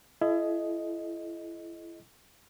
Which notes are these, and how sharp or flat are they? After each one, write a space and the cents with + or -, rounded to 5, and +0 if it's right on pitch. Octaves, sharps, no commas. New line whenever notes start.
E4 +30 A4 -40 D#5 +0